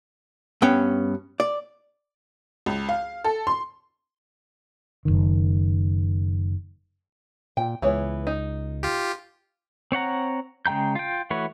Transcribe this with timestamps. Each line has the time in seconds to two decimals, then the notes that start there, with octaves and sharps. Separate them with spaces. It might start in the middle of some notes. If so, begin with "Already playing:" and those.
0.62 G2 B3 C#4 G5
1.40 D5
2.66 C#2
2.89 F5
3.24 A4
3.47 C6
5.05 F#1 C2 D#3
7.57 A#2 G5
7.82 C#2 E3 B3 C#5
8.27 D#4
8.83 F4 G4
9.92 C4 C#5 F#5 A#5
10.66 C#3 G#3 G5 A#5 G6
10.95 F4 G5
11.30 E3 A3 F#4 B4 C#5